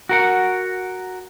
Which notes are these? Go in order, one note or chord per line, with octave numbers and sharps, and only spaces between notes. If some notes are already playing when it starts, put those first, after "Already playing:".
F#4 A#4 F#5